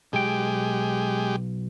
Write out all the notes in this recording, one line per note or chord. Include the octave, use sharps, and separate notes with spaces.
B1 G#3 G4 G5